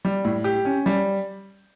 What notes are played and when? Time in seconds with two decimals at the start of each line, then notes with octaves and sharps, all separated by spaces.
0.05 G3
0.25 A2
0.44 G4
0.65 C#4
0.86 G3